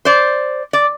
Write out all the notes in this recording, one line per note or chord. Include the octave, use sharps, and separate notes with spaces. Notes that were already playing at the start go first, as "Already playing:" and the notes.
C5 D5
D5